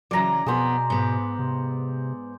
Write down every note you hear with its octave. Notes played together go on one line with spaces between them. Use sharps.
C#3 E3 F#3 D5 A#5
F2 B2 B3 G#4 C5
G#2 B3
C3